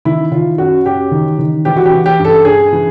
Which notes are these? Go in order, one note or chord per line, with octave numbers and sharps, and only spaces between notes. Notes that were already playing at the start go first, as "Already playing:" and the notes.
D#3 E4
D#3 F4
F#2 F#4
F#2 G4
D#3
D#3
E3 G4
F#4
G4
E3
G4
G2
A4
G2 G#4
E3